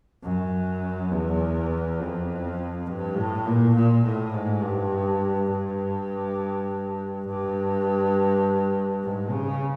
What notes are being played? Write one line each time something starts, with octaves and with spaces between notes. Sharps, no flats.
F#2
E2
F2
G2
A2
A#2
A#2
A2
G#2
G2
G2
G2
G#2
C#3